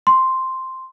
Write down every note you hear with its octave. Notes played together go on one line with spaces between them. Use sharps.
C6